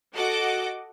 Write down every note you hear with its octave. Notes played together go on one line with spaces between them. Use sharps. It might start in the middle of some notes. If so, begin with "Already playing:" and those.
F#4 A4 D#5 F#5 D6